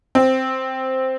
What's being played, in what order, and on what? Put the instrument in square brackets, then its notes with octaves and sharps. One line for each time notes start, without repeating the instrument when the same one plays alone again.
[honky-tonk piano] C4